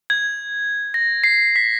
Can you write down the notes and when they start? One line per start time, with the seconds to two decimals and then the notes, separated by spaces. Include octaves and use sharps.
0.10 G#6
0.94 A#6
1.24 C7
1.56 B6